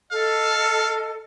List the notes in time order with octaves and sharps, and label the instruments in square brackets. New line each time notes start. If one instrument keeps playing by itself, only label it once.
[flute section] A4 D#5 [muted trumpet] F5